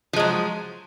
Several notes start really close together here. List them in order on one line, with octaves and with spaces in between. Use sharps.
F3 G#3 F#3